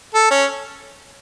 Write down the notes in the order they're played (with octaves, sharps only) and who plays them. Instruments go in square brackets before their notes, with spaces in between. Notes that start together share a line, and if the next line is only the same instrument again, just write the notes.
[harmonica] A4
C#4